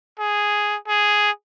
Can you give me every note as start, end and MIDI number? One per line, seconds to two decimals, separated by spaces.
0.19 0.76 68
0.88 1.31 68